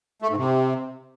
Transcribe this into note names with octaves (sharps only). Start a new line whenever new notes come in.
A3
G#2
C3